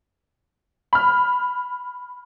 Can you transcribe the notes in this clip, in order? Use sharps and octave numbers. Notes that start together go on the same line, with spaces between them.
B5 F6